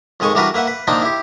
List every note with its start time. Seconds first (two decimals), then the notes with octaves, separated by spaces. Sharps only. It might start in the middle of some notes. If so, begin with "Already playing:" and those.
0.20 F2 D#3 G#3 G#5 C#6
0.35 E3 G3 D4 F#4 A#4 B4
0.54 A#3 B4 E5 F#5
0.67 B4
0.87 D#3 F3 A#3 D4 D#4 G5
1.02 E4 G4